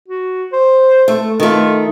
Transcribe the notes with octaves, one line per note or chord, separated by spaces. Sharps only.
F#4
C5
A3
D#3 A3 F4